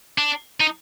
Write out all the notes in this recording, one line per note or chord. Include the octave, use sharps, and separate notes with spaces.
D4
D#4